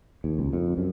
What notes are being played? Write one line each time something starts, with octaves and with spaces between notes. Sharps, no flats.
D#2
C#2
F2
F#2